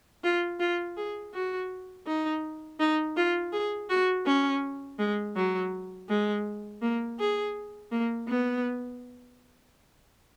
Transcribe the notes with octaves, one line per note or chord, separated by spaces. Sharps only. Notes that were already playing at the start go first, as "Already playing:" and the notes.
F4
F4
G#4
F#4
D#4
D#4
F4
G#4
F#4
C#4
G#3
F#3
G#3
A#3
G#4
A#3
B3